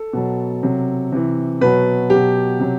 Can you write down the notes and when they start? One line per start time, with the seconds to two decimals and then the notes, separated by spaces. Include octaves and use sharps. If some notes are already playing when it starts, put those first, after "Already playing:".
Already playing: A4
0.13 B2 F#3
0.63 C3 F#3
1.12 C3 E3
1.61 B2 F#3 B4
2.10 F#3 G4
2.15 B2
2.59 C3 F#3